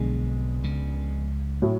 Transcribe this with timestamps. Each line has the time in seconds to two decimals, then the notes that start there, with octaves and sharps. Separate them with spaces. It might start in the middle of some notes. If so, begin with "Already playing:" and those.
Already playing: B1 F2 B2 D3 G#3 B3
0.64 C#2 C#3
1.62 A2 F#3